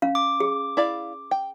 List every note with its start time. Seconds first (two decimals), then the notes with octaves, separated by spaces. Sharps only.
0.02 C#4 F5
0.15 D6
0.40 G#4
0.77 E4 D5 F5
1.31 G5